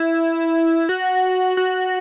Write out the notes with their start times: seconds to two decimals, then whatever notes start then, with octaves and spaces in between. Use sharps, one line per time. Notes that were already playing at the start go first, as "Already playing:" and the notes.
Already playing: E4
0.89 F#4
1.57 F#4